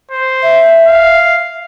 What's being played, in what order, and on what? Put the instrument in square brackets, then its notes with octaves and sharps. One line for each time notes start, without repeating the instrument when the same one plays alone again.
[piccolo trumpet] C5
[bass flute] E5
[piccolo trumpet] F5